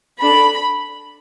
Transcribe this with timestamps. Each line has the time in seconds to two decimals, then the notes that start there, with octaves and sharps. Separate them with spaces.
0.22 D4 A4 B5